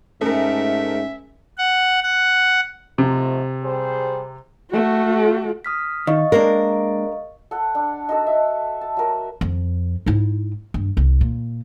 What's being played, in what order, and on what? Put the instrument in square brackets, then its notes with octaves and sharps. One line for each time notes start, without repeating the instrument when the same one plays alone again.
[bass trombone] G#2 [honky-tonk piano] A3 A#4 [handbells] C#4 [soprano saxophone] E5
[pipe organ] F#5
F#5
[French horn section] G#2 F3 A3 [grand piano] C3
[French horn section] G3 G#4 C5
[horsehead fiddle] A3 F#4
[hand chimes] D#6 F6 B6
[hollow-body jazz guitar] D#3 [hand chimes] D#5 F5 C#6
[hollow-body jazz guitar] G#3 A#3 D4 [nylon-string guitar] A#4
[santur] A4 F#5
D4
D#4 F#4 A4
E5
A5
F#3 A#4
[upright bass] F2
G#2 E4
G2
C2
A#2